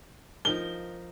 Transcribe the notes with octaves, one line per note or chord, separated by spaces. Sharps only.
F3 D#4 A#4 G7